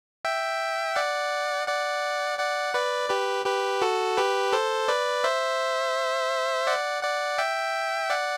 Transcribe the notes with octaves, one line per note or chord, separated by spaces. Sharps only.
E5 G5
D5 F#5
D5 F#5
D5 F#5
B4 D5
G4 B4
G4 B4
F#4 A4
G4 B4
A4 C5
B4 D5
C5 E5
D5 F#5
D5 F#5
E5 G5
D5 F#5